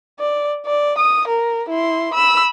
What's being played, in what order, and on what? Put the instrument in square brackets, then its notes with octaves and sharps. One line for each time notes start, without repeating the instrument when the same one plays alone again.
[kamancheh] D5
D5
D#6
A#4
E4 C6
B5 E6